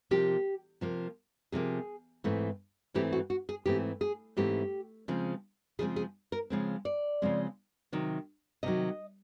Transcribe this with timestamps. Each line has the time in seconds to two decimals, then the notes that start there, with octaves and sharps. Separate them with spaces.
0.11 C3 F3 A#3 G4
0.81 C3 F3 A#3
1.52 C3 F3 A#3 G#4
2.24 G#2 E3 A3 C4
2.94 G#2 E3 A3 C4 G4
3.12 F#4
3.30 F#4
3.49 G#4
3.66 G#2 E3 A3 C4 G4
4.01 G#4
4.37 G#2 E3 A3 C4 G4
5.08 C#3 F3 G#3 C4
5.79 C#3 F3 G#3 C4 G#4
5.96 G#4
6.32 A#4
6.50 C#3 F3 G#3 C4
6.85 D5
7.22 C#3 F3 G#3 C4
7.92 C3 D#3 F#3
8.63 C3 D#3 F#3 D#5